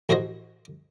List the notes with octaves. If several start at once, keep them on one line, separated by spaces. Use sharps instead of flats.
A1 F#4 G#4 C5 D#5